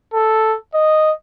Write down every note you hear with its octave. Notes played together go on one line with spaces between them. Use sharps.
A4
D#5